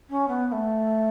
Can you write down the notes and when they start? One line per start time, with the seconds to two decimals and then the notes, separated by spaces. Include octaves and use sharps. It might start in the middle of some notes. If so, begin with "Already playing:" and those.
0.09 C#4
0.28 B3
0.47 B3
0.52 A3